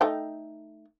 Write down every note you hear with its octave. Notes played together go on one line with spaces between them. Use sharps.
A3 D#4 G5